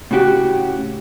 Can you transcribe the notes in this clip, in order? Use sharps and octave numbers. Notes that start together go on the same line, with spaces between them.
A2 C#3 F#4 G4